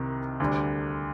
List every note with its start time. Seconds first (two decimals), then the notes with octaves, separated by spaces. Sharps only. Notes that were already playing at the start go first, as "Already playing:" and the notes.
Already playing: C2 C3 D#3
0.40 D2 D3 G3 D4